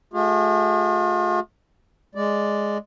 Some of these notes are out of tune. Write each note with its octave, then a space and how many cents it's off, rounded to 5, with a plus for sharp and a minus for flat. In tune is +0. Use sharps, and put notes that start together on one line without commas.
A3 -30 F4 +45 G#4 -40
G#3 +0 D5 +0